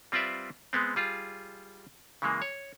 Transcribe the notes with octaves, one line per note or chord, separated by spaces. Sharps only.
G3 C4 F4 B4 D5 E5
G#3 B3 C4
G3 F4 G#4
C#3 E3 G#3 A#3
C#5